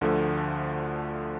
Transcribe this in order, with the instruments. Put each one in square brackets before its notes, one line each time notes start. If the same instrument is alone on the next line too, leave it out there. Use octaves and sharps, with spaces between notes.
[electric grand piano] D2 D3 F3 A3